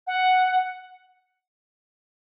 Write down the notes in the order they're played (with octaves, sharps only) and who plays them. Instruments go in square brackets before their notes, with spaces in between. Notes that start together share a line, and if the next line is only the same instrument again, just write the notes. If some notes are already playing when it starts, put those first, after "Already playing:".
[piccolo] F#5